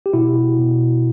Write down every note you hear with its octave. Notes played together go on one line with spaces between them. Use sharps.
G4
B2 E4 F#4
B2